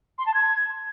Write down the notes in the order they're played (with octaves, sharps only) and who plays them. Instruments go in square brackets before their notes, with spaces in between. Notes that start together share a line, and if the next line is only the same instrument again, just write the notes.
[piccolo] C6
A5
G#6